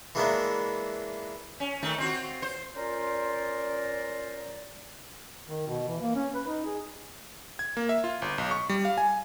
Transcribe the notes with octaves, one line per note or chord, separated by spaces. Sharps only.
E3 G#3 A#3 B3 D4 E4
C#4
D#3 A3 A#3
C4 F4 F#4
C5
C#4 F4 A#4 C5 D5
D#3
B2
E3
A#3
C#4
B4
D#4
G#4
G#6
A#3
E5
F4
G1
B1
C#6
G3
F5
G#5